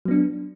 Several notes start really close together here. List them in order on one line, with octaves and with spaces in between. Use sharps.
F#3 B3 D4